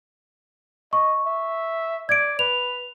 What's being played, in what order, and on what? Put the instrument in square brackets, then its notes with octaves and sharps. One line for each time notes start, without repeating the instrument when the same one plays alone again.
[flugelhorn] D#5 [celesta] C#6
[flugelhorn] E5
[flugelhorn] D5 [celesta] G#6 D7
[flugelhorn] B4 [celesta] F7